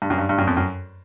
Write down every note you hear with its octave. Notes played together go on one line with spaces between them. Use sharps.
G2
F#2
G2
G2
F#2
F2
F#2